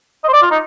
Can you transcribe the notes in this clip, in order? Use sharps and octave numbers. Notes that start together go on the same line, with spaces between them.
D#5
C5
D5
F4
D#4